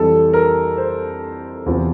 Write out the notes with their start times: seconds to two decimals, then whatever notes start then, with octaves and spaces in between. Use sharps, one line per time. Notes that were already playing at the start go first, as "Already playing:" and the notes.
Already playing: F2 E3 G3 A4
0.34 A#4
0.78 C5
1.66 E2 C3 F3